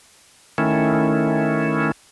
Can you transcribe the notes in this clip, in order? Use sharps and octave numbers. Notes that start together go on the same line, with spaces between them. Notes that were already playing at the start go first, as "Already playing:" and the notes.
D#3 A3 C#4 E4